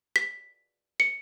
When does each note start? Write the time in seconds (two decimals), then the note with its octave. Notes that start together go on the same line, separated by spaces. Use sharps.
0.16 B6
1.00 C#7